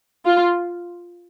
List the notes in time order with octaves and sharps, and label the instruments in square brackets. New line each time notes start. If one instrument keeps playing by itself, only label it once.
[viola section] F4